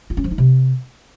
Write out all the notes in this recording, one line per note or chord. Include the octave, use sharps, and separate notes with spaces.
F4
C#4
F3
D#4
C3